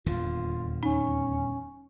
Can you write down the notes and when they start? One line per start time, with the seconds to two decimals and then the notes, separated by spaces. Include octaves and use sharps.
0.06 D#1 E2 D3 F4
0.83 C#4 D#4